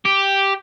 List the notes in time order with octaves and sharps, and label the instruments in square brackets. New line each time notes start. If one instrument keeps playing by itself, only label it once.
[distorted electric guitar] G4